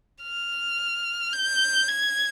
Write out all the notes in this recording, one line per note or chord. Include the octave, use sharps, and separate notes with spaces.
F6
G6
G#6